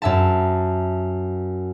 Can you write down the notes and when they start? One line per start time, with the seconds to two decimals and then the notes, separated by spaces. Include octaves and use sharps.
0.02 F#2 E5 A5